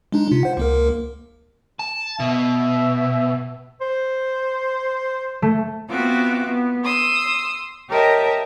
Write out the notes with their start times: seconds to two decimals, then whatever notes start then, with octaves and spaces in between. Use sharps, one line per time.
0.12 G#3 D4 D#4
0.31 C3 F4
0.43 C5 F#5
0.57 C#2 A#3 A#4
1.79 A5
2.20 B2 E5
3.81 C5
5.42 A3
5.88 B3 C4 F4 F#4 E5 D6
6.48 B3
6.83 C6 D#6 E6
7.88 G4 A#4 C#5 D#5 E5 A5